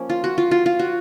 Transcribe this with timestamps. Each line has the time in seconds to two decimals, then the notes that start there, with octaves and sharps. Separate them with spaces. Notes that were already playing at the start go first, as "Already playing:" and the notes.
Already playing: F3 A#3 C#4
0.09 F4
0.24 F#4
0.38 F4
0.51 F4
0.66 F4
0.79 F#4